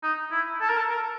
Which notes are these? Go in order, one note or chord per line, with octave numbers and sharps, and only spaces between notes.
D#4
E4
A4
A#4
A4
A#4